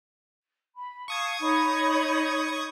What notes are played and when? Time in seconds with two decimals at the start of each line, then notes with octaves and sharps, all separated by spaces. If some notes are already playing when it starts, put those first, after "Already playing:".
0.76 B5
1.08 F5 A5 C#6 D#6 G#6
1.41 D#4 C#5 B5